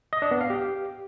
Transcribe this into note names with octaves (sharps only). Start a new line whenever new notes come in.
D#5
D4
B3
F5
G4